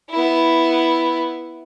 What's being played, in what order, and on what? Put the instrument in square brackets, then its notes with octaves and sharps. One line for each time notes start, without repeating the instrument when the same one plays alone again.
[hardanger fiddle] B3 E4